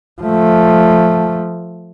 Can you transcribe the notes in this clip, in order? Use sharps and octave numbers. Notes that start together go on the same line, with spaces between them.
F3 A3